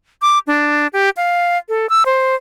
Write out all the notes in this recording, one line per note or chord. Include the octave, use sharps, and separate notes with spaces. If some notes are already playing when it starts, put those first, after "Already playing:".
D6
D4
G4
F5
A4
E6
C5